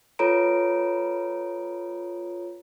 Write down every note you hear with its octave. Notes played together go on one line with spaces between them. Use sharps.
F4 A4 B4 C#5 A#5 D7